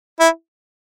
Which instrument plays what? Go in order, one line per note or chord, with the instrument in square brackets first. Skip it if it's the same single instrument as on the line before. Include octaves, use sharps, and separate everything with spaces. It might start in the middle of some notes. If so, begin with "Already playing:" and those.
[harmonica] E4